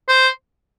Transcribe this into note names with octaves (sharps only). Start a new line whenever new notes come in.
C5